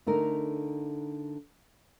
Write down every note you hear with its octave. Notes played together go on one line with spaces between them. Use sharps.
D3 A3 D#4 A#4